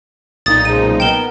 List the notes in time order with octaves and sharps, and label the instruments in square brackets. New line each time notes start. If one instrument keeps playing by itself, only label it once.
[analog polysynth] B1 A#2 D#4 [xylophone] D#6 A6
[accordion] C#3 F3 G#3 [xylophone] D#7
[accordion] B3 A#4 [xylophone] G5 E7 G7